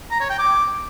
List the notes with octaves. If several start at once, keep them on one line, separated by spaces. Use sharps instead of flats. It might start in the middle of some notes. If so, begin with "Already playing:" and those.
A#5
C#5
G5
D6